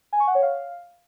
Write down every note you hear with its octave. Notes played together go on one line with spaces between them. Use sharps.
G#5
C#6
F#5
C#5
F5